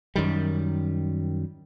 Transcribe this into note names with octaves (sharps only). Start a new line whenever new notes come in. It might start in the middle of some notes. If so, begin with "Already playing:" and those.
F#2 D#3 G3